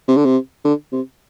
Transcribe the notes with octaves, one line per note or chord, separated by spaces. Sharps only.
C3
D3
C3
D3
C3